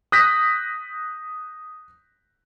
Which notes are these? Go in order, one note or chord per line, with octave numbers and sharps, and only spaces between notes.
D#6 F#6 G6 A#6 B6